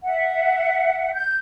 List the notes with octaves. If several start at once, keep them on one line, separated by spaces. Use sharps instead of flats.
E5 F#5
G6